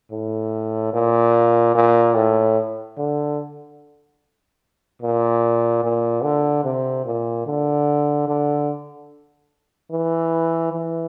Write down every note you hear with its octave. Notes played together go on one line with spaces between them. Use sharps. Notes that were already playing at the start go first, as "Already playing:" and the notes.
A2
A#2
A#2
A2
D3
A#2
A#2
D3
C3
A#2
D3
D3
E3
E3